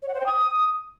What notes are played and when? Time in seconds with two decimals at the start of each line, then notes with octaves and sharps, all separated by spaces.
0.02 C#5
0.08 F#5
0.14 C5
0.20 G5
0.26 D#6